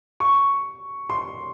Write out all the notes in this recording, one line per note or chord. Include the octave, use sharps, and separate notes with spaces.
C#6
C6